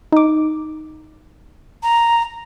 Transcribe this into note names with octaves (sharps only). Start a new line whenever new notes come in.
D#4 D6
A#5